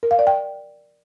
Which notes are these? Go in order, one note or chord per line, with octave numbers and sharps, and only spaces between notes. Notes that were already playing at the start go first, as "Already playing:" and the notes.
A#4
F5
D5
G5